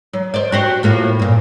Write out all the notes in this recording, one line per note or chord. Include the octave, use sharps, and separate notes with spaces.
F#3
C5 D5
F#4 G4 C5
A2 A#3 F4
G2 A#2